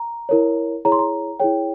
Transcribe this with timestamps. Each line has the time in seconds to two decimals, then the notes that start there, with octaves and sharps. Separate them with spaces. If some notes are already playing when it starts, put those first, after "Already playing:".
Already playing: A#5
0.29 E4 A#4 C#5
0.85 E4 G#4 C#5 A#5
0.92 C6
0.99 A#5
1.39 E4 G#4 C#5 G5